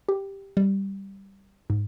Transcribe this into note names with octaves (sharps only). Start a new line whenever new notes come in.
G4
G3
G#2